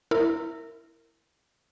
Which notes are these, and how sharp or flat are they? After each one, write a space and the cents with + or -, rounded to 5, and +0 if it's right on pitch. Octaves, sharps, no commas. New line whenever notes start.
E4 +0 A#4 -20